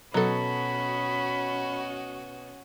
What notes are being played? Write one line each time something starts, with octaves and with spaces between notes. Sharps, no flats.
B2 F#3 C#4 F#4 A4 B5